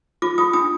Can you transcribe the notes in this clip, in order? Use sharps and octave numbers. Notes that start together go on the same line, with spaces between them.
F4 D6
F4 D#6
D4 D#6